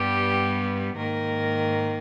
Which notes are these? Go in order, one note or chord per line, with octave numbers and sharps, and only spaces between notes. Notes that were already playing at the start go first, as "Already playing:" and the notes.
Already playing: G2 G3 B3 G4
G#2 D#3 A#3 A#4